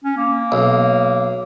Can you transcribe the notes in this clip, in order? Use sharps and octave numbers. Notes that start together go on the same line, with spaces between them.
C#4
A#3
B1